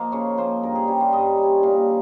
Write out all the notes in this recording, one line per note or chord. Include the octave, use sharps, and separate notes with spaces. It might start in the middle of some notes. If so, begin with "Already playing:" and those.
Already playing: F3 A#3 D#5 F5
C#3 C#5
F3 A#3 C5
G2 A#4
G#4
G3 C#4 G4
F4
G2 D#5
G3
C#4
A#2 F5